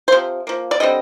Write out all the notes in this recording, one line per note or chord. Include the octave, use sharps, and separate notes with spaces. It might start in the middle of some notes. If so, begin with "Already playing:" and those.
C5
C3 F3
F3 A#3
D5
D3 G3 C4 D#5